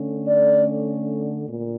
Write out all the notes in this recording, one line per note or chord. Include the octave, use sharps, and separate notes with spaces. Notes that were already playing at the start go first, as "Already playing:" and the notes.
Already playing: D3 A3 C#4
D5
A#2